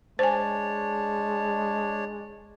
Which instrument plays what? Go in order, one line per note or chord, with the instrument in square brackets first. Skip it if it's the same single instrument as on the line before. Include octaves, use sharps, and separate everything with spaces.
[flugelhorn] G#3 [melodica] D4 C#5 A5 [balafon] C5 G#5